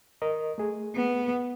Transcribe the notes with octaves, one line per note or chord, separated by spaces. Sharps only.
A#4 D#5
A3 G#4
B3